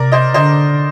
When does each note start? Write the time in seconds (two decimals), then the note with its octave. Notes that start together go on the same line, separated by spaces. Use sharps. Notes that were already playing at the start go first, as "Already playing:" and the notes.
Already playing: C3 A#4 D5
0.12 C5 D#5
0.34 D3 C5 D#5